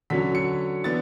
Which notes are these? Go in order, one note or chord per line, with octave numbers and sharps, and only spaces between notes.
D3 F#3 C#4 B6
C#7
E3 B3 D4 A6